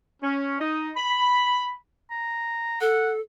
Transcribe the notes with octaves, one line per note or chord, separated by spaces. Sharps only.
C#4
D#4
B5
A#5
A4 F#5